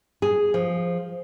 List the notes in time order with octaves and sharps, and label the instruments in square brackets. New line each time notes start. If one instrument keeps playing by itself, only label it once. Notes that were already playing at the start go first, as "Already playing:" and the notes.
[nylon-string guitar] G#4
F3